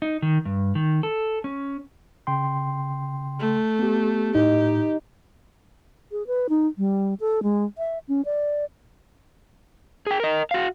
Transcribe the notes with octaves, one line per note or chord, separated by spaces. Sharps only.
D#4
D#3
G2
D#3
A4
C#4
C#3 G5 C6
A3
B3 G4
A2 D#4 G4
G#4
B4
D#4
G3
A4
G#3
E5
C#4
D5
G#4 G5
A#4 D#5
F#4 F5